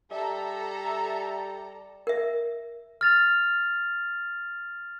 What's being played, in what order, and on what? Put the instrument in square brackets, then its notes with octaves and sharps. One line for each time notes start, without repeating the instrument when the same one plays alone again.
[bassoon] G3 [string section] A4 A#5 [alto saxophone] E5
[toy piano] A#4 E5
[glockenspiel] F6 A6 F7